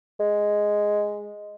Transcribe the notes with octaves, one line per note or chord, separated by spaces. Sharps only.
G#3